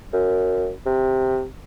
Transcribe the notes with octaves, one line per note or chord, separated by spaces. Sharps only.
F#2
C3